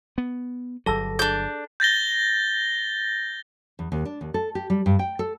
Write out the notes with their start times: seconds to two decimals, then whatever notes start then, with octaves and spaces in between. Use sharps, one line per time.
0.18 B3
0.86 G1 F#3 G#4 A4 A5 E6 A#6
1.19 D4 G#4 G6
1.80 G6 A6 A#6 G7
3.79 E2
3.92 D#2
4.05 D4
4.21 D#2
4.34 A4
4.55 G4
4.70 G3
4.86 G2
4.99 G5
5.19 A4